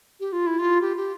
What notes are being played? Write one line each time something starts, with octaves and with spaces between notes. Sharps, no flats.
G4
F4
E4
F4
G4
G4